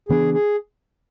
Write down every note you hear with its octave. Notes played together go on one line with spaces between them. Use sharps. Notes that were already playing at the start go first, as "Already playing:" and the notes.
C#3 E3 B3 D4 G#4
G#4